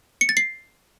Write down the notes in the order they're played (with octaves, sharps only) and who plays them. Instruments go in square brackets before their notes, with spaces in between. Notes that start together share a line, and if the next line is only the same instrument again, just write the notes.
[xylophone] C#7
A6
C7